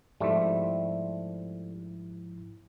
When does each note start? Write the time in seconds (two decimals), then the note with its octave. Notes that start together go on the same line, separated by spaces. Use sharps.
0.20 G#2 F3 G3 A3 C4 E4